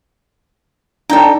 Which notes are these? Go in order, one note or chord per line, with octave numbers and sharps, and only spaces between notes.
D4 D#4 A4 D5 G5 A#5